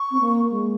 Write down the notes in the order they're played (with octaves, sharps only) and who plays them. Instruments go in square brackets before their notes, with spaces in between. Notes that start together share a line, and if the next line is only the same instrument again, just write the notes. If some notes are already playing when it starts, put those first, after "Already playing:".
Already playing: [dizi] C#6
[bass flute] C4
A#3
G#3